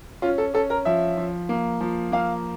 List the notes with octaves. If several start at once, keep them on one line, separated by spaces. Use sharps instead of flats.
C#4 F4
A4
C#4 A4
A#4
F3 E5
F3
A#3
F3
A#3 F5